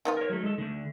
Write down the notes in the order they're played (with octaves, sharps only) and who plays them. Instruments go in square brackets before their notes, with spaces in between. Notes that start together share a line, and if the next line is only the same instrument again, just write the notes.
[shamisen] D#3 B3 F4
[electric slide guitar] A#4 C#5
F#3 A3
G#3 A4
D3 A3